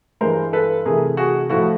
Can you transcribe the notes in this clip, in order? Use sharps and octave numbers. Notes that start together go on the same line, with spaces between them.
G2 E3 G#3 A#4 C5
A4 B4
C3 E3 A3 G#4 A#4
F#4 G#4
A2 F3 A3 E4 F#4